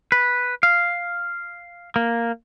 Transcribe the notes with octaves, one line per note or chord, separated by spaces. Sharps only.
B4
F5
A#3